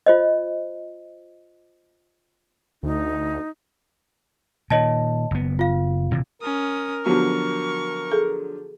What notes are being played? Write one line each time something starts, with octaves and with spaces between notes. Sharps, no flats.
F4 C5 D#5
D2 D#4
A#2 D#3 C#5 D#5 A5
F#1 B3
F4 F5
D#1 C3 E3
C#4 A#4 D#6
D3 F3 F#3 B3 F#4 G4 C#6
G#4 A4